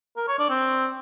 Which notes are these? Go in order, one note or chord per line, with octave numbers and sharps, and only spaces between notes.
A#4
C#5
D4
C4